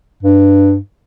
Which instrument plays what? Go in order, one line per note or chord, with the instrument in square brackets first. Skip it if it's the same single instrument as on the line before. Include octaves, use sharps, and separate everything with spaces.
[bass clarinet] G2